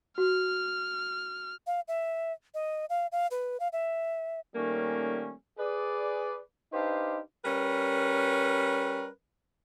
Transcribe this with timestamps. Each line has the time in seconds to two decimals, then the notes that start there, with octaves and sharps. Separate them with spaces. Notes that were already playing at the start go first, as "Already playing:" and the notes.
0.18 F#4 F6
1.66 F5
1.88 E5
2.54 D#5
2.89 F5
3.12 F5
3.31 B4
3.60 F5
3.72 E5
4.55 D#3 G3 A3 A#3 C#4
5.58 G#4 B4 D5
6.73 D4 D#4 G4 B4 C5 F5
7.44 G3 C#4 A#4 B4